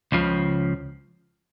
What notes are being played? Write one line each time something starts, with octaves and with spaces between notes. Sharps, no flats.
C#2 C#3 F3